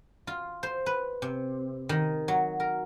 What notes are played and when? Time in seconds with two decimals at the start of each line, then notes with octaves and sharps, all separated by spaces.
0.27 F4
0.63 C5
0.86 B4
1.22 C3
1.89 D#3
2.28 F#3
2.60 A#4